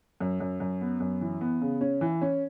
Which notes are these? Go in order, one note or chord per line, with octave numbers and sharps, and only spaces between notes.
F#2
F#2
F#2
B3
F#2
E3
B3
C#3
C#4
E3
C#4